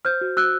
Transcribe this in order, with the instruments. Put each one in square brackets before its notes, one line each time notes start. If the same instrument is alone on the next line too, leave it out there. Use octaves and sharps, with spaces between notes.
[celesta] C5 F6 G6
F#4
F#4 E6 F#6